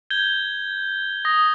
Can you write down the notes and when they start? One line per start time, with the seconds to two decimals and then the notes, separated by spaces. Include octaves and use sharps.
0.10 G6 G#6 G7
1.25 D#6 A#6